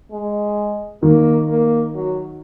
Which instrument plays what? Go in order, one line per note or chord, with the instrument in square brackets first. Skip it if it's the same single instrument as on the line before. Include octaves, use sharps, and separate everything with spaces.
[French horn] G#3
[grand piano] D#3 [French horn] A#3
[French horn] A#3
F#3